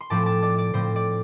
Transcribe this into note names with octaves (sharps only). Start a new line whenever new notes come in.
C6
A2 F3 C4 A5 D6
A5 D6
D5
D5
A2 F3 C4 C5
D5